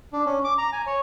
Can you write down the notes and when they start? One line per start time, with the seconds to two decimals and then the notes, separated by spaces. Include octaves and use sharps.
0.13 D4
0.26 C#4
0.44 D6
0.58 A#5
0.73 G#5
0.86 C#5